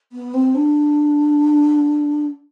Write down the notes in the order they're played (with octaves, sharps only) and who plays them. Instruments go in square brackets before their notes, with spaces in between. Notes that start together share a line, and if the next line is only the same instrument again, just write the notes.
[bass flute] B3
C4
D4